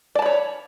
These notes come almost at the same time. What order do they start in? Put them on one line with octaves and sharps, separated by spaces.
D5 A5 B5 C#5